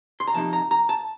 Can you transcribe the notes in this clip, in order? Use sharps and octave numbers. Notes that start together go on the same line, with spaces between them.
C6
A#5
C3 F3 A#3 D#4 A5
A#5
A#5
A5